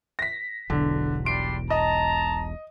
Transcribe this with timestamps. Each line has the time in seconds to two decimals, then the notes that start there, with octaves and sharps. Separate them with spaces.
0.19 A#6 B6
0.70 E1 B1 D3
1.26 G3 D4 C6 D7
1.70 D#5 A5 A#5